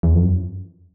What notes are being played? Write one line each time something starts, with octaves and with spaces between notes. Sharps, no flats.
E2
F2
F#2